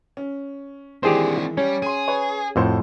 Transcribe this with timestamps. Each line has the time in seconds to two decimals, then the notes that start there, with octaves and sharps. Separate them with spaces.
0.17 C#4
1.03 D#3 E3 G#3 C4 D4 G4 G#4 C5
1.57 G3 C#4
1.82 G#4 C6 D#7
2.08 B4 C#5
2.56 F2 A2 F#4 A4 C5